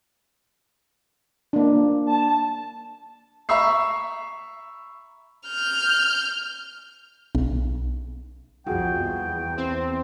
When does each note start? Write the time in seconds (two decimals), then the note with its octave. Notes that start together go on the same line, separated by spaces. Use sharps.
1.53 A#3 D4
2.09 A5
3.49 E5 A#5 B5 C#6 E6 C7
5.49 F6 G6
7.35 B1
8.66 C2 F2 F4 F#4 G#4 G5
9.02 E2
9.58 C4 C5